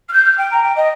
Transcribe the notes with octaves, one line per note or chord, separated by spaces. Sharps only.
F6
G6
F6
G5
A#5
G5
D#5